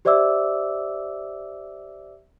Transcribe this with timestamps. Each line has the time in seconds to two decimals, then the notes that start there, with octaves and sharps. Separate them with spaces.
0.05 G4 C5 D5 E5 D6 E6